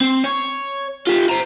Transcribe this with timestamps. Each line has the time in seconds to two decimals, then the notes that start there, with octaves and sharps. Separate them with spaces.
0.01 C4
0.24 C#5
1.07 F4 G4
1.29 C5 A#5